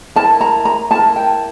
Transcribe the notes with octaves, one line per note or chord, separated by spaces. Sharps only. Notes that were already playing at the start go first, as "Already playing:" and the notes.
E4 A#4 A5
A#5
A#5
E4 A#4 A5
G5